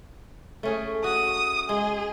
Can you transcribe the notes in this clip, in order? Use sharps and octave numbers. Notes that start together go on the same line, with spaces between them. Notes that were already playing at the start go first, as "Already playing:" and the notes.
A3 C#4 G#4
F#4 D#6
G#3 G#4